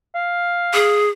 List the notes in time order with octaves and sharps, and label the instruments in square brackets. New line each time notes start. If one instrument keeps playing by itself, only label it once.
[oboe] F5
[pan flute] G#4